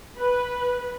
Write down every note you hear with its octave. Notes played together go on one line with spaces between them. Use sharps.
B4